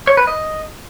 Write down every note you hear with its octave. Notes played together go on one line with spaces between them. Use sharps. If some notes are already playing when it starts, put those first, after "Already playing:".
C#5
B4
D#5